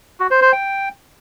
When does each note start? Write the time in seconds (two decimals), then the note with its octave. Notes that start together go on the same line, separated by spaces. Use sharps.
0.20 F#4
0.31 C5
0.42 C5
0.53 G5